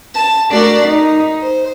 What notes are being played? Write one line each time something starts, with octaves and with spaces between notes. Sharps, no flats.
A5
A3 D4 F#4 A#4 D5
D#4
C5